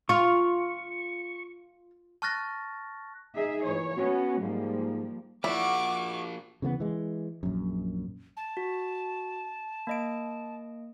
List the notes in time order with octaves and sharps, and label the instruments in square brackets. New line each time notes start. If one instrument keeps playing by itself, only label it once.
[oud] F4 [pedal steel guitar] C#6
[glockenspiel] A5 C#6 F6 F#6 A6 A#6
[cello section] D#4 G#4 E5
[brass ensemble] A#2 E3 [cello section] C#5
[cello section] B3 C#4 [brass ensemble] F#4
[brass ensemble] G#2 [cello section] F3 G3 A#3
[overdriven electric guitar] F3 A#3 [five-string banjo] E4 [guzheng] F#4 D5 [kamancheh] C#6 D6
[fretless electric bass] C#3 E3 A3 B3
E3 G#3
A#1 F#2
[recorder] A5
[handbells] F#4
A#3 D#5 D7